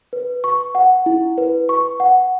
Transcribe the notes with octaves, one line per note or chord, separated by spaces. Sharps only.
B4
C#6
F#5
E4
B4
C#6
F#5